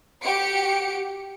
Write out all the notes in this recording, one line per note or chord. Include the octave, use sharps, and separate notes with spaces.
F#4 G4 C#7 D7